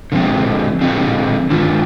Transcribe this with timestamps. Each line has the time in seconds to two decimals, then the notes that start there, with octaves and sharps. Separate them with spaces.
0.12 D3 F3 G#3 C4
0.81 D3 F3 G#3 C4
1.50 D#3 G#3 D4 F4